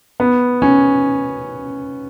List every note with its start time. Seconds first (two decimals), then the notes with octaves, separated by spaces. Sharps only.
0.20 B3
0.62 C#4